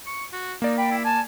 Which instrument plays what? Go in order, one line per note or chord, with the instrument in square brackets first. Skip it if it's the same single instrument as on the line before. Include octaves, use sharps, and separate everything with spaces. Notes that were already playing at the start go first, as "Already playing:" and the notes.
[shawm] C#6
F#4
[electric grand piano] A#3 D5 [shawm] D#4
[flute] G5 [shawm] B5
[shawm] E4
[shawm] G#5 [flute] A5